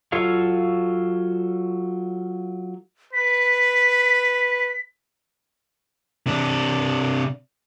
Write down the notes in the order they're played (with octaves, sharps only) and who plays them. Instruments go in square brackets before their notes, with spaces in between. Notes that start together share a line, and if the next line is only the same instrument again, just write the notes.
[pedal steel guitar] F#3 F4 A4 C#5 F5
[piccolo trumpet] B4 [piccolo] B6
[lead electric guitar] C3 D4